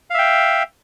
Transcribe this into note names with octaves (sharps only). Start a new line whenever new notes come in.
E5 F5 G5